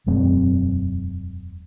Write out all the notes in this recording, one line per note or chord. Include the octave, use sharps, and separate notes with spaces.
E1 F#2 G#3 C4